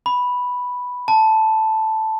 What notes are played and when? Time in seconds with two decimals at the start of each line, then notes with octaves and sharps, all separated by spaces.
0.06 B5
1.08 A5